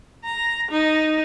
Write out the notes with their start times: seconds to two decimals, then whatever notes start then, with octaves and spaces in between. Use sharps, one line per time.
0.24 A#5
0.71 D#4